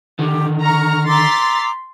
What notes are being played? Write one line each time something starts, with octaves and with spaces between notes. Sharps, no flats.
D3 D#3 G4
A#5 C#6 F6
A#5 C6 D6 E6 A6 B6